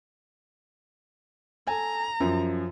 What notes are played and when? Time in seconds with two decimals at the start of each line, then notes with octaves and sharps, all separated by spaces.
1.67 A4 G#5 A#5
2.20 F#2 F3